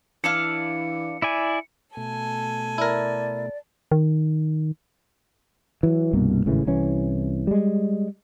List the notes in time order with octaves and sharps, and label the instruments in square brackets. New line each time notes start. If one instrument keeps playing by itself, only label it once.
[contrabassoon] E3 [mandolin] D4 E4 F5 [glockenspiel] C#7
[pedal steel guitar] E4 D5 G#5
[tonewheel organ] B2 A3 [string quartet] A4 G#5
[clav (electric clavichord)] E4 A#4 [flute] D5
[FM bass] D#3
[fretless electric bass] E3 F#3
C2 G2 B2 A#3
G#1 A2 C#3 E3
C2 C3 E3 C#4
G3 G#3